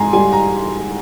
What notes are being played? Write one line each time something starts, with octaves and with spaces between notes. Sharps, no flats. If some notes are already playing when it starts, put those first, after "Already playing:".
Already playing: G#2 G#5 A#5 C6
G3 G#5
A#5